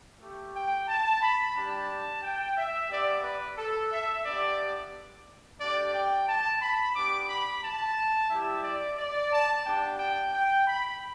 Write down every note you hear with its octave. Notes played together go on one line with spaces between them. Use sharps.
A3 G4
G5
A5
B5
G3 D4 G4 A5
G5
E5
B3 G4 D5
B4
A4
E5
B3 D4 G4 D5
A3 D4 G4 D5
G5
A5
B5
B3 D4 G4 D6
B5
A5
G3 E4 G4 E5
D5
D5
A5
B3 D4 G4 G5
G5
G5
B5